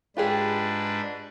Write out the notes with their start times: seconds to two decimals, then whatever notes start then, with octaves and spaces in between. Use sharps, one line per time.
0.17 G#2 D4 F4 G4 G#4 B4